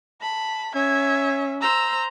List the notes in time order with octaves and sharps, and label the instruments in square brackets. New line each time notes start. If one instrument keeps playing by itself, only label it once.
[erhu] A5 [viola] B5
[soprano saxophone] C#4 [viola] E5 [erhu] G#6
[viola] C5 A#5 [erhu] E6